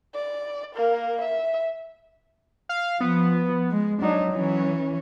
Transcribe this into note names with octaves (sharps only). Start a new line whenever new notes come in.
D5
A#3 A#4
E5
F5
F3 B3
G#3
F#3 D4 D#4
E3 C#4